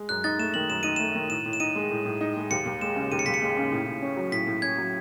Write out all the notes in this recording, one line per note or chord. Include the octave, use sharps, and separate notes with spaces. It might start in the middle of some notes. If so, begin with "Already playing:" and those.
Already playing: G#3
F#2 F#6
D#4 A6
A3 E7
D#3 F#7
F#2 E7
D#4 D#7
A3 E7
D#3
A2 E7
A2
E7
D#4 D#7
G#3
A2
A2
D#4
G#3
D#2 C#7
D#2
G#3 E7
C#3
D#2 D#7
C#7
D#2 B6
C#7
G#3
C#3
A2
A2
C#4
F#3
A2 B6
A2
C#4 G#6
F#3